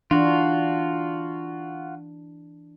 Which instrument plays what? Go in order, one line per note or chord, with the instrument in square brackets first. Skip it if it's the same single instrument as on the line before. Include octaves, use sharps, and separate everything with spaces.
[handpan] E3 D4 [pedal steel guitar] F4 F#4